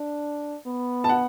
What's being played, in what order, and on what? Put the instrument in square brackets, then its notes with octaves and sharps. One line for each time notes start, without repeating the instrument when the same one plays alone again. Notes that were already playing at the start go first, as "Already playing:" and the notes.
Already playing: [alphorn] D4
B3
[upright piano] A5
F#5